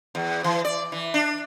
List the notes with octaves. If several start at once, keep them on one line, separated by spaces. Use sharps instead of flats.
E2
E3
D5
E3
D4